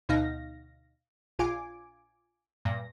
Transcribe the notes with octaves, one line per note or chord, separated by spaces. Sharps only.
D2 B2 D#4 F5 A#6
A#1 F4 G#5 D6
G2 A#2 A#6